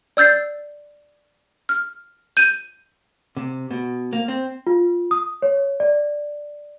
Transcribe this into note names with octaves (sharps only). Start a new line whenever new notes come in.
D5 E6 G6 A6 C7
F6
G6 D#7
C3
B2
A#3
C4
F4
D#6
C#5
D5